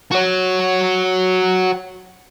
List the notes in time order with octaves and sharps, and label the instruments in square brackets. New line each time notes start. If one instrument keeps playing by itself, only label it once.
[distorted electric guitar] F#4 C#5